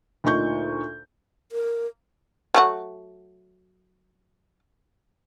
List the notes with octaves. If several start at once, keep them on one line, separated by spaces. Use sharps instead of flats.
D2 A#2 D#4 C#6 G6
A#4
F#3 A3 F#4